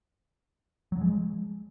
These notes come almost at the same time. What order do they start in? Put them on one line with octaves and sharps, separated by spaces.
F#3 F3 G#3